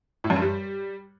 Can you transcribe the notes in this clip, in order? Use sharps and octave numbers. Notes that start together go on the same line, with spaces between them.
A2
F#2
G2
G3